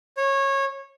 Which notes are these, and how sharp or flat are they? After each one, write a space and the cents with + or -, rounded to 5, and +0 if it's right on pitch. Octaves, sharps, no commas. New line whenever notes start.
C#5 -20